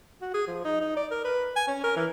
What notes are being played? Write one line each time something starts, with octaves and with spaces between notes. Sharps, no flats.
F#4
G#4
F3
D#4
D#4
D5
A#4
B4
G#5
C#4
A#4
E3